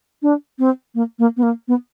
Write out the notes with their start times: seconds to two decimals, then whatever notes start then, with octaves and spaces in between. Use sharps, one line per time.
0.22 D4
0.59 C4
0.95 A#3
1.19 A#3
1.37 B3
1.43 A#3
1.68 B3